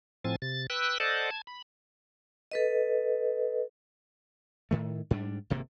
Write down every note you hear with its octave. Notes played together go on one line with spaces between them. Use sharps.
A2 F3 C4 G#5 A6
C3 A6
B4 G5 E6 F#6
A4 C5 D5 D#5 F#5 A5
A5 G#6
B5
A4 B4 D#5
A2 D#3 A3
G#2 G3 D4
G#1 C3 A#3